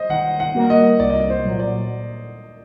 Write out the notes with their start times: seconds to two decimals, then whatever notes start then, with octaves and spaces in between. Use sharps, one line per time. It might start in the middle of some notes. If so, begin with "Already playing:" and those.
Already playing: C5 D#5
0.09 D#3 F#5
0.40 F#5
0.55 G3 A#3 F#4 A#4
0.70 D#5
0.99 C2 D5
1.10 D#5
1.20 D5
1.30 C5
1.45 A#2 F#3
1.60 D5